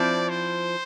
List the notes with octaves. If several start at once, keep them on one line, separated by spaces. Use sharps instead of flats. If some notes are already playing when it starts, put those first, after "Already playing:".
Already playing: F3 C4 E4 D5
C5